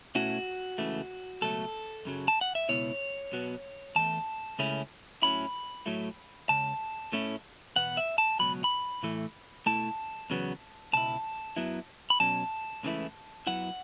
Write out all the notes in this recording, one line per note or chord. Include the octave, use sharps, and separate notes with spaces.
B2 A3 C#4 E4 F#4
C#2 C#3 E3 A3
C#2 B2 F#3 A3 A4
F#2 C#3 F#3
A5
F#5
E5
C#2 B2 B3 E4 C#5
B1 B2 F#3 B3
E2 E3 A3 A5
C#2 C#3 A3 C#4 E4
A2 F#3 C#4 E4 B5
A2 F#3 A3 E4
C#2 C#3 A5
A2 A3 C#4 E4
E2 B2 B3 F#5
E5
A5
C#2 B2 F#3 B5
B5
A2 E3 A3
B2 A3 E4 A5
E2 C#3 F#3 B3
C#2 B2 E4 A5
F#2 F#3 B3 E4
B5
B2 F#3 C#4 A5
C#2 C#3 E3 A3 E4
F#2 F#3 B3 E4 F#5